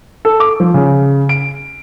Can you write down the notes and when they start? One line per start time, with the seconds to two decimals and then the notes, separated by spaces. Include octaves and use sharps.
0.25 A4
0.40 D6
0.60 F3
0.74 C#3
1.29 D7